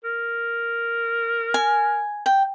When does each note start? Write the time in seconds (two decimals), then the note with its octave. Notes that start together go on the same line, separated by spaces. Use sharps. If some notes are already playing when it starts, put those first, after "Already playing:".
0.04 A#4
1.54 G#5
2.26 G5